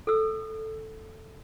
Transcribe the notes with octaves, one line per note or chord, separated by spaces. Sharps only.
A4 E6